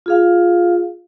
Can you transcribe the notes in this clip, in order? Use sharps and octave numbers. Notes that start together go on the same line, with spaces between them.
F4 G#4 F5